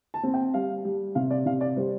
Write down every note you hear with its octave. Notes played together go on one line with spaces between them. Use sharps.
A5
C4
G5
G3 F5
G3
C3 F5
D5
C3 F5
D5
G3 C5